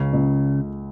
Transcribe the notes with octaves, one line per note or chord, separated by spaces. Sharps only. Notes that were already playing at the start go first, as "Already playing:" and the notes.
Already playing: C#2 C#3
C#2